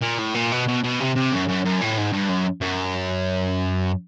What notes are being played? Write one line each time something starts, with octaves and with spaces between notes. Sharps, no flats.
A#2
A2
A#2
B2
B2
B2
C3
C3
F#2
F#2
F#2
A2
G#2
G2
F#2
F#2